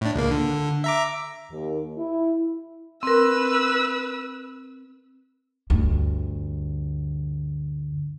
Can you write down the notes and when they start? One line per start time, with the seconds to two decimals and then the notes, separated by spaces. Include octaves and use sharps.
0.01 A2 D4
0.15 C#2 A#3
0.31 D3
0.84 E5 A#5 D6
1.51 D#2
1.98 E4
3.03 C4 A#4 B4 E6
5.70 D2 G2